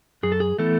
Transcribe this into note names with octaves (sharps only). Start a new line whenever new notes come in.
F#2 G#4
A4
G#4
E3 A3 B3 E4 A4